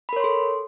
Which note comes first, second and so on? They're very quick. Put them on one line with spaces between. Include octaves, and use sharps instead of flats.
B5 A#4 C#5 C6 A4